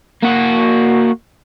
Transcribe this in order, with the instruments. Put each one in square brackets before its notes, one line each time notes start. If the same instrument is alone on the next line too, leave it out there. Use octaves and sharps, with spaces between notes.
[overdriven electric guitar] A#3 F#4